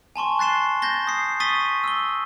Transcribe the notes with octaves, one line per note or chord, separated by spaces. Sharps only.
G#5 A5 C6 C#6
F#6 A6 C7 E7 G7
G6 A6 A#6 G7
D#6 C7
C#6 D#6 A6 B6 D#7 G7
E6 G7